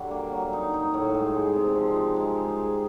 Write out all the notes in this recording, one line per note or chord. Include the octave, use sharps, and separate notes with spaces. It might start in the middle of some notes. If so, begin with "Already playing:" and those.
Already playing: D3 F#3 G3 D4
A#3
F#3
D#4
D#4
A2
G#3
G#3
C3
F3
D#4
G#3
D#4
G#4